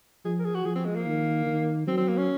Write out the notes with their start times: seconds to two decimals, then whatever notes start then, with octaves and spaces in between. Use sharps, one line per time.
0.25 F3 G#4
0.40 A#4
0.45 G#4
0.55 F#4
0.65 F3 G#4
0.76 C4
0.85 G#3
0.96 A#3
1.06 D#3
1.46 D#3
1.87 F#3 C4
1.97 C4
2.08 A#3
2.17 C#4